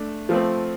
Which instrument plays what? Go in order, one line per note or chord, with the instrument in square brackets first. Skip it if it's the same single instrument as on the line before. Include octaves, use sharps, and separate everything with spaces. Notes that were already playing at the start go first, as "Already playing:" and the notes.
Already playing: [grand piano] A3 D4
F3 A3 C4